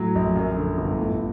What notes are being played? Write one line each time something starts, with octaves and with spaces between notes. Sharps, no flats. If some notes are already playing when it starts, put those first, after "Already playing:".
Already playing: A2 F#3
A#1
F#2
D3
G1
A2